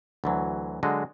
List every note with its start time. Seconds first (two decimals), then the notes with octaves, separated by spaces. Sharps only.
0.24 D2 E3 F#3
0.83 D3 F#3 G#3 F#4 D#5